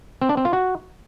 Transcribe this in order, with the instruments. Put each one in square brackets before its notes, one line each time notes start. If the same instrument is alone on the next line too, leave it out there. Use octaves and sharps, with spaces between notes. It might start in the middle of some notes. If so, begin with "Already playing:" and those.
[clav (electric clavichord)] C4
D4
C4
F4
F#4